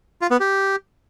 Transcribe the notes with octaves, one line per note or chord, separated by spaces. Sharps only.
F4
B3
G4